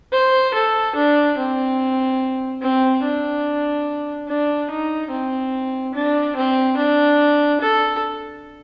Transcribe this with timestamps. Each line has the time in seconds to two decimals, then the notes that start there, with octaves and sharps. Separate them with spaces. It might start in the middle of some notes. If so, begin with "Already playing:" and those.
0.12 C5
0.54 A4
0.95 D4
1.38 C4
2.62 C4
3.03 D4
4.28 D4
4.70 D#4
5.11 C4
5.94 D4
6.36 C4
6.77 D4
7.61 A4